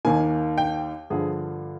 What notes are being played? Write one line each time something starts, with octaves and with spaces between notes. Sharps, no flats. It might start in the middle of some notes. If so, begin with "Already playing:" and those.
D#2 D#3 A#3 G#5
G5
G2 D3 F3 G#4